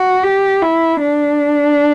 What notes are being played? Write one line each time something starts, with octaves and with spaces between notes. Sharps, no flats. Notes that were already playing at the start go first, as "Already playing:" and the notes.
Already playing: F#4
G4
E4
D4